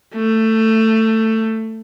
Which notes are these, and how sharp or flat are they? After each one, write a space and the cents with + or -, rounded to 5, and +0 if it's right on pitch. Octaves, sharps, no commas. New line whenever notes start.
A3 +15